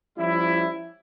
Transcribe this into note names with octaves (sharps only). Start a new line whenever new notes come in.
F3 G3 C#4 E4